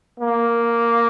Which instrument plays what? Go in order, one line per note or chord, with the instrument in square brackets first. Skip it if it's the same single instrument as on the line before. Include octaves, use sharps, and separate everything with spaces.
[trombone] A#3